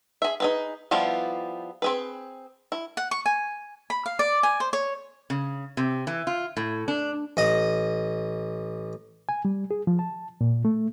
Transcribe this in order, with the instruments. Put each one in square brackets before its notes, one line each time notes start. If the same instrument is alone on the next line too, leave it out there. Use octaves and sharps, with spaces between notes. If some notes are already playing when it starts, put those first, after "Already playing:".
[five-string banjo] G#4 E5
D#4 G#4 B4
F3 G3 B3 E4 F4
C4 G#4 B4
E4
[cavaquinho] F#5
C#6
G#5
B5
F5
D5
G#5
C5
C#5
[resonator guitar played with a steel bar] C#3
C3
E3
F4
A2
D4
[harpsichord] A1 D#5 D#6
[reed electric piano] G#5
G3
G#4
F3
A5
A#2
A3